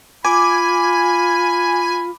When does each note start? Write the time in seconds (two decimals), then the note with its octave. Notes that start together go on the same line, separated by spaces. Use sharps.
0.25 F4 G#5 B5 D6